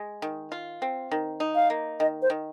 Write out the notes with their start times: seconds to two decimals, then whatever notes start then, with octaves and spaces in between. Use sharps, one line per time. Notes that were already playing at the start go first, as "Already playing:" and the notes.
Already playing: G#3
0.22 D#3
0.52 F4
0.82 C4
1.11 D#3
1.40 D#4
1.55 F5
1.70 A#3
2.00 D#3 D#5
2.22 C5
2.30 D#3